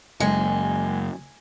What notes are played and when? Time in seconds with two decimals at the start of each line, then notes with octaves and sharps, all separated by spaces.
0.20 F#1 G#3